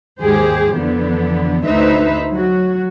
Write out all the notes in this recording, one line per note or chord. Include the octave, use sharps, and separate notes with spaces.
D#2 G#2 G4 G#4 C5
F2 D3 E3 B3
D2 D#4 B4 C5 E5
F#3 F#4